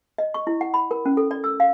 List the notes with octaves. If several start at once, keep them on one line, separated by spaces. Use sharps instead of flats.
D#5
C#6
E4
F#5
B5
A#4
C#4
A4
D5
E6
F5